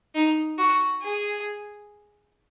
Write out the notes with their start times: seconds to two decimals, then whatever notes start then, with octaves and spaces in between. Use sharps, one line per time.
0.15 D#4
0.58 F#4
1.02 G#4